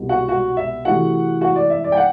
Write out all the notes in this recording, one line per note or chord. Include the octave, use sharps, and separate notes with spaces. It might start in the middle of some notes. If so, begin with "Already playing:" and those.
Already playing: C2 B2 G3
F#4 F#5
F#4 F#5
E5
C3 E3 A3 E4 F#4 F#5
F#4 F#5
D5
E5
D5
G5
F#5